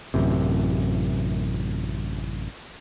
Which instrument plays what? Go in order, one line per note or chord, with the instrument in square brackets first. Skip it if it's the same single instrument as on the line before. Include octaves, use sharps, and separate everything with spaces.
[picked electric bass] A1 F#2 C3